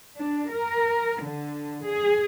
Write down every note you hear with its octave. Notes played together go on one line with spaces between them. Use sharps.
D4
A#4
D3
G#4